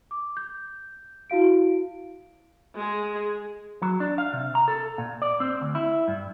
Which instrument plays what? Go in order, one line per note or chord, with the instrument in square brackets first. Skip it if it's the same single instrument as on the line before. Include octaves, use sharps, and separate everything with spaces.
[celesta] D6
G6
E4 F#4 F5 D7
[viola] G#3 G#4
[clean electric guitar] F#3
D4
F5
C3
A#5
A4
A#2
D5
C4
D2
E4
G2